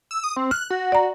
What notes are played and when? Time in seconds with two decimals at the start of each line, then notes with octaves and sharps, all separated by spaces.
0.11 E6
0.24 D#6
0.36 C4
0.51 F6 F#6
0.70 F#4
0.92 D5 A#5